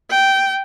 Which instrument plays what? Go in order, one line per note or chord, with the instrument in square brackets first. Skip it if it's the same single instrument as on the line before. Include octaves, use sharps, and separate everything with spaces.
[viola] G5